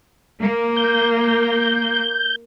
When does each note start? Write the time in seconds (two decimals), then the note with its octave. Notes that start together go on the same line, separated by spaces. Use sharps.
0.40 A#3
0.76 G6